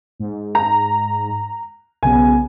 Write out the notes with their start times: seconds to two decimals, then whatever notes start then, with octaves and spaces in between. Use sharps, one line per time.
0.19 G#2
0.55 A#5
2.03 B1 C#3 B3 G#5